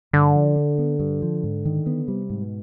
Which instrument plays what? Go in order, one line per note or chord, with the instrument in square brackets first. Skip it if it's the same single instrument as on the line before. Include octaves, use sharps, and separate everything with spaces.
[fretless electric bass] G2 [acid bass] D3
[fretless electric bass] F3
D4
B3
G2
F3
G#2
D#3
B3
[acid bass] C3 [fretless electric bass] G3
[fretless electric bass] G#2
[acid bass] B2